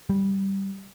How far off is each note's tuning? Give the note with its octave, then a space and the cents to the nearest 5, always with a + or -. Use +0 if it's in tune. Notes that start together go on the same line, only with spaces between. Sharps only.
G3 -5